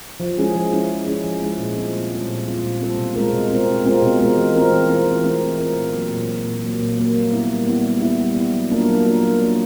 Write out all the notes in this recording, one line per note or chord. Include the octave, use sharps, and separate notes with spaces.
F3
G#3 C#4 E4 G#4
F3
G#3 C#4 E4 G#4
F3
G#3 C#4 E4 G#4
F3
G#3 C#4 E4 G#4
A#2
G3 C4 F4 A4
A#2
G3 C4 F4 A4
A#2
G3 C4 F4 A4
A#2
G3 C4 F4 A4
B2
G#3 C4 F4 A#4
B2
G#3 C4 F4 A#4
B2
G#3 C4 F4 A#4
B2
G#3 C4 F4 A#4
E3
A3 C4 F4 A#4
E3
A3 C4 F4 A#4
E3
A3 C4 F4 A#4
E3
A3 C4 F4 A#4
A#2
F#3 A#3
A#2
F#3 A#3
A#2
F#3 A#3
A#2
F#3 A#3
G3
B3 E4
G3
B3 E4
G3
B3 E4
G3
B3 E4
F#3
A#3 D4 F4 A#4
F#3
A#3 D4 F4 A#4
F#3
A#3 D4 F4 A#4